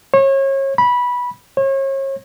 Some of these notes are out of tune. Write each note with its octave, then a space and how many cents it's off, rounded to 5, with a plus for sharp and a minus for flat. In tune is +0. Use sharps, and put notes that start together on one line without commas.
C#5 -30
B5 -15
C#5 -35